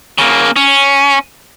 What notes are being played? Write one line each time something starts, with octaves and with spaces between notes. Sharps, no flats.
C#3 A#3
C#4